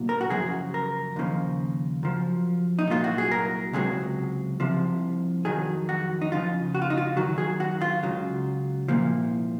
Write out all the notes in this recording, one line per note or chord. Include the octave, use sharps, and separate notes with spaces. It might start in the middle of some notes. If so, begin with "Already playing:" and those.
Already playing: C2 A#2 F#3
A#4
F#4
F#2 C#3 F3 G#4
A#4
D#2 C#3 F3
F#2 F3
D#4
C2 A#2 F#3 F4
F#4
G#4
A#4
C#2 C3 D#3 F#3 G#4
C2 C3 F3
F2 D#3 F#3 G#4
F#4
D#4
F2 C#3 F3 F4
F#4
F4
D#4
F4
F#2 D#3 F#3 F#4
G#4
F#4
F4
C#2 C#3 F#3
C2 A#2 F3